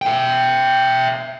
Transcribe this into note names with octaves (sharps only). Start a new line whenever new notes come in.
E5 G5